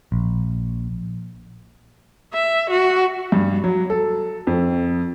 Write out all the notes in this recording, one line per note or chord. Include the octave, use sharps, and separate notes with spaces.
A#1
E5
F#4
G2
F#3
A4
F2